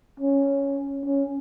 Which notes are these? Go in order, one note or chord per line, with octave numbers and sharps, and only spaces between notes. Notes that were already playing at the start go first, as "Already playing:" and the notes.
C#4
C#4